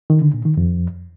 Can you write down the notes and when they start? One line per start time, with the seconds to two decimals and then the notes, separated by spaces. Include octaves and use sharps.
0.10 D#3
0.22 D3
0.34 A#2
0.46 D#3
0.57 F2